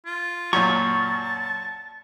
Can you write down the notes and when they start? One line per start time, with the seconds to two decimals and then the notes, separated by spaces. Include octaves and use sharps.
0.06 F4
0.53 F#2 A#2 A5 C#6